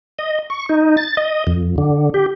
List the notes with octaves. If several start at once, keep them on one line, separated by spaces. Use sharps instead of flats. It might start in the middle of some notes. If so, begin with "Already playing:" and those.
D#5
C#6
D#4
A6
D#5
F2
D3
G4